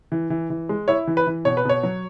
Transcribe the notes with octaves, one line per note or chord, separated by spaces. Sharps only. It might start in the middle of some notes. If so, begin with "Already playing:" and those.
E3
E3
E3
G#3
E4 C#5
E3
B4
E3
B2 C#5
B4
B2 C#5
F#3